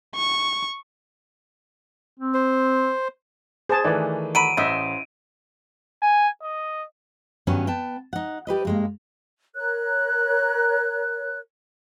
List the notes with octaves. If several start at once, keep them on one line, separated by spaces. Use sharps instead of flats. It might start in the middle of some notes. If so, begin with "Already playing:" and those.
C#6
C4
C5
G#4 C5 A5 D#6
D#3 E3 A3 B4 D5
F#3 B5 D7 D#7
A1 C#3 C5 D#5 E5
G#5
D#5
G2 D#3 F#3 B3 C#4
B3 G5 A5
D#4 F#5
G3 G4 B4 D#5
G2 G#3 A#3
A#4 C#5 F#6